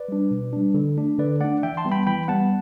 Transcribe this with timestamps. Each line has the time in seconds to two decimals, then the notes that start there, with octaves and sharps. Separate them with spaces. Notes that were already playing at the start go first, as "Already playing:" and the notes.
Already playing: B4 D5
0.08 G3 D4
0.31 B2
0.53 G3 D4
0.74 D3
0.97 A3 D4
1.19 D3 B4 D5
1.40 A3 D4 D5 F#5
1.63 E3 E5 G5
1.77 A5 C6
1.85 G3 B3
1.92 G5 B5
2.07 E3 G5 B5
2.28 G3 B3 F#5 A5